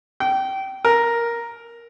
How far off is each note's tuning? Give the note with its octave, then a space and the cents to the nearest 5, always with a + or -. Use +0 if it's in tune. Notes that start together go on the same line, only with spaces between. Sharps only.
G5 -25
A#4 +5